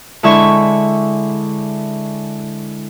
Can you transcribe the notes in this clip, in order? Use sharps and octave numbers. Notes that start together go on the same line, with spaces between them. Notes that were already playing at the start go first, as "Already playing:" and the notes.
D3 G#3 E4 E5 C#6